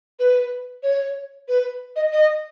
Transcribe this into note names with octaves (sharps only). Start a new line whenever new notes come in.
B4
C#5
B4
D#5
D#5